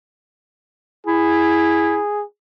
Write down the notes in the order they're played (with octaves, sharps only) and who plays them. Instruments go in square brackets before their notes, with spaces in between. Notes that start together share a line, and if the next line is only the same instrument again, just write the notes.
[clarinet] E4 [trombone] G#4